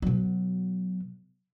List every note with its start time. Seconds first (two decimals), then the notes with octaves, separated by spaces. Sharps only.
0.02 B2 F#3